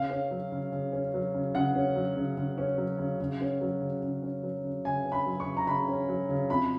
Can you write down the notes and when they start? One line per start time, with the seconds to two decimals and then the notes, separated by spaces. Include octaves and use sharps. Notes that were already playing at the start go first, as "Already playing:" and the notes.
Already playing: C#3 F5
0.10 C#4
0.31 F#3
0.52 C#3
0.72 C#3
0.92 C#4
1.14 F#3
1.35 C#3
1.55 C#3 F#5
1.75 C#4
1.96 F#3
2.16 C#3
2.37 C#3
2.58 C#4
2.78 F#3
2.99 C#3
3.20 C#3
3.41 C#4
3.61 F#3
3.81 C#3
4.03 C#3
4.22 C#4
4.43 F#3
4.64 C#3
4.85 C#3 G#5
5.05 C#4
5.12 B5
5.26 F#3
5.40 C#6
5.46 C#3
5.57 A#5
5.67 C#3 B5
5.88 C#4
6.08 F#3
6.29 C#3
6.50 F2 B5